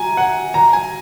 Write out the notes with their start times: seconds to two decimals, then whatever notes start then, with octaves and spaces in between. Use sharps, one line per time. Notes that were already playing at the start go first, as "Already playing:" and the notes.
Already playing: G#5 A#5
0.17 F#5
0.54 A#5
0.73 G#5